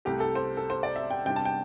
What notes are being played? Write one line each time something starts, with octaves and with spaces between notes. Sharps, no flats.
C2 C3 A3 G4
A4
C5
A4
C5
D5
E5
G5
C3 G3 D4 G5
A5
G5